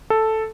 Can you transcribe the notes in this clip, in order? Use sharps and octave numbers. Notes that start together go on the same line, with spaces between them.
A4